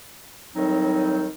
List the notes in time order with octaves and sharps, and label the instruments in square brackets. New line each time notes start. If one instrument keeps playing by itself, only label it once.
[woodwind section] A2 D#3 F#3 G3 C4 D#4